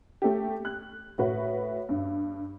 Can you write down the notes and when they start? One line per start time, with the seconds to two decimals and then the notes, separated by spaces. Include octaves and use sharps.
0.22 A3 G4
0.65 F#6
1.18 A2 F#4 B4
1.89 G2